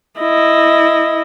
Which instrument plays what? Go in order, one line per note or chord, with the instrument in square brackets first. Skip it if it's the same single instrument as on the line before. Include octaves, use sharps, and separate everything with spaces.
[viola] E4 D#5